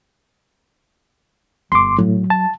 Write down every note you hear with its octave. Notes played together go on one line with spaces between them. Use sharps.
G1 C6 D6
A2 F#3
A5